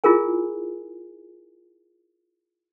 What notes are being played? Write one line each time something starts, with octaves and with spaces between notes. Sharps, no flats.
E4 F4 G#4 A#4 G#5